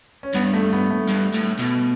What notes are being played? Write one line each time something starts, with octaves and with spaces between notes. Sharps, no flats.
C#4
G2 B3
A3
B3
A3
G2
A2
B2